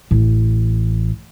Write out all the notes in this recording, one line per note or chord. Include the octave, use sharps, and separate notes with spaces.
A1